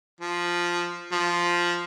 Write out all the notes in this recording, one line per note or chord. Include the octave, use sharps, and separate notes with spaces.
F3
F3